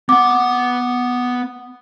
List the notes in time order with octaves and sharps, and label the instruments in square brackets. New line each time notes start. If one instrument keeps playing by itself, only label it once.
[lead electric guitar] B3 F#5 [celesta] D6